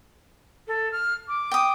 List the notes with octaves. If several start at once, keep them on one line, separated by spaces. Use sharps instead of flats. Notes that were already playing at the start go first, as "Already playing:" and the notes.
A4
F6
D6
G5 D#6